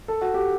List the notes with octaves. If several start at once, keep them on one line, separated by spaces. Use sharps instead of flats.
A4
F#4
G4